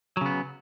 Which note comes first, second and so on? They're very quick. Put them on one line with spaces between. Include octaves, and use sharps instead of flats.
F#3 C#3 B3